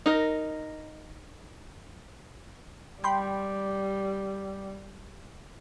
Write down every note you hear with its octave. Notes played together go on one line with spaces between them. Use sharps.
D#4 A#4
G3 G5 B5 C6